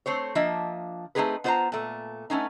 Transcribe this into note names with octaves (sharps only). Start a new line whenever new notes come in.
A3 C4 C5 C#5
F3 A#3 D4 D#5 E5
A3 A#3 C4 D#4 G#4 B4
B3 F4 C5 C#5 A5 A#5
A#2 A3
A3 B3 C#4 D#4